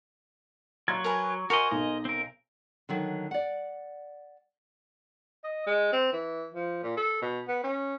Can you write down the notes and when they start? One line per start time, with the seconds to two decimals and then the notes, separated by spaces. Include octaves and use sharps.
0.88 F#3 A#5 C6 G#6
1.04 A#4 B4 G#5
1.50 F#4 A#4 C5 D#5 G#5
1.71 B1 D#5
2.05 C4 A#4
2.89 D3 D#3 F#3
3.31 D5 F#5
5.44 D#5
5.67 G#3
5.93 C4
6.13 E3
6.54 F3
6.83 A#2
6.97 A4
7.22 B2
7.48 B3
7.64 C#4